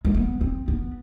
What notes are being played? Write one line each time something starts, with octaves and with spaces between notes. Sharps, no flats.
G#3
B3
C4
B3